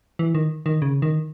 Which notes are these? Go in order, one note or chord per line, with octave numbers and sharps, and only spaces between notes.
E3
D#3
D#3
C#3
D#3